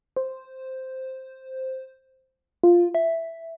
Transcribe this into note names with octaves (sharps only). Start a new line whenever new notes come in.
C5
F4
E5